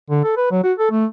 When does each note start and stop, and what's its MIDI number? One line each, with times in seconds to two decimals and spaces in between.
0.10 0.22 50
0.24 0.33 69
0.37 0.47 71
0.51 0.60 54
0.64 0.73 66
0.79 0.91 69
0.91 1.06 57